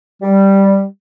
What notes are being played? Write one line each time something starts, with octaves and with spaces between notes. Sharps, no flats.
G3